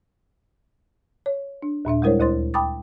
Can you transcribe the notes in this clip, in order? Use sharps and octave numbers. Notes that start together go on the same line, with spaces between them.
C#5
D4
D#2 A#2 D4 E5
G3 G#3 E4 A#4 C5 C#5
D2 E4 C5 C6 A6
G5 A5 B5 D6 D#6 A6